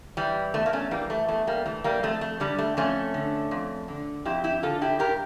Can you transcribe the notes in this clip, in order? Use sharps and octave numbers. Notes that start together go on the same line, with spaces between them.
E3 G3
E2 A3
A#3
A3 C#4
E3 G3 A#3
A3
E2 A3
G3 A#3
E3 A3
G3 A#3
F2 A3
A3
D3 G3
A3
F2 A3 C#4
D3
F2
D3
F2 E4 G4
E4 G4
D3 F4 A4
E4 G4
G2 G4 A#4